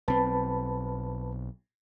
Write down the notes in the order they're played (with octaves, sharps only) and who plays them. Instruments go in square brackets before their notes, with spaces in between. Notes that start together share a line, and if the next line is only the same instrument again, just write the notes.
[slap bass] B1 C4 [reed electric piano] B4 A5 B5